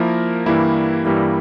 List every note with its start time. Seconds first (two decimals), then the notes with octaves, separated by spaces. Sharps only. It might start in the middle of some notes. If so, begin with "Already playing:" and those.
Already playing: F3 A#3 E4 A#4
0.46 G2 E3 G3 A#3 E4
1.05 G2 E3 G3 A#3 E4